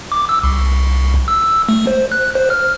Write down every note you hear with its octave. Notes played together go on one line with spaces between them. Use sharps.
D6
E6
C2
E6
A3
C5
F#6
C5
F6